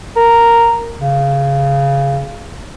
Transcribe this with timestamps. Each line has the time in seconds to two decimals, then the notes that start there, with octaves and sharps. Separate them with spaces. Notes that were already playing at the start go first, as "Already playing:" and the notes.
0.16 A#4
1.01 C#3